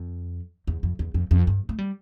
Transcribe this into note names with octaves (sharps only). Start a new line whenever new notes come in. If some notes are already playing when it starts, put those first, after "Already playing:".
Already playing: F2
E2
F2
E2
F2
F2
G2
A3
G3